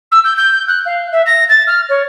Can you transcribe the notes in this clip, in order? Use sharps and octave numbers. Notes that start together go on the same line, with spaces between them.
E6
G6
G6
F#6
F5
E5
A#6
A6
F6
C#5